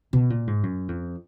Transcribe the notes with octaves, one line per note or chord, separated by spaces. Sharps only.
B2
A#2
G#2
F#2
F2